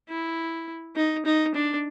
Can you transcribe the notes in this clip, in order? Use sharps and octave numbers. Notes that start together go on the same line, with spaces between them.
E4
D#4
D#4
D4